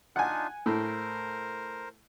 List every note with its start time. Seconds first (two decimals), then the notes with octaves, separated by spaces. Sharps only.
0.16 D4 D#4 F4 F#5 G#5
0.66 A2 A#4 C5